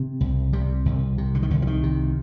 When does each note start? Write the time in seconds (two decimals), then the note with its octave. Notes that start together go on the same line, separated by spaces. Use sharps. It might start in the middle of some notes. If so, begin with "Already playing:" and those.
Already playing: C3
0.21 C2
0.53 C3 G3
0.86 C2
1.18 C3
1.35 D3
1.43 D#3
1.50 C2 D3
1.62 F3
1.67 D#3
1.83 C3